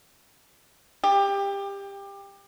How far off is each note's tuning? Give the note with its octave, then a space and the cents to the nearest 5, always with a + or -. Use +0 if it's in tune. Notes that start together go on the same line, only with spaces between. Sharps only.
G4 +20